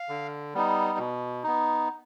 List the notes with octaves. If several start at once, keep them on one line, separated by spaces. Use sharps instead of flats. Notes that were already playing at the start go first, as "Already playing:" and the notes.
Already playing: F5
D3
G3 B3 D#4
B2
B3 D#4